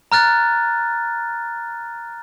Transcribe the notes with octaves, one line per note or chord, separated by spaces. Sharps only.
A#5 F6 F#6 A6